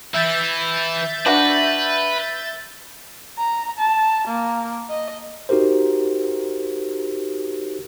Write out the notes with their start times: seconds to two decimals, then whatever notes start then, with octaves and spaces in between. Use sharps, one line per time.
0.14 E3 E5 G6 A6
1.26 D4 F#4 B4
3.37 A#5
3.79 A5
4.28 A#3
4.90 D#5
5.49 D#4 F#4 G4 A#4 C5